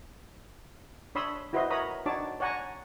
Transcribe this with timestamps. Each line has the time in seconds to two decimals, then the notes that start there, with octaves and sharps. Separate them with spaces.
1.15 D4 C#5 B5 C6 D#6 E6
1.53 E4 F#4 B4 C5 D#5 C6
1.70 A#4 C#5 A#5 B5 D#6
2.06 D4 D#4 F#4 C#5 A5 D6
2.40 C#5 D5 F#5 G#5 A#5 C#6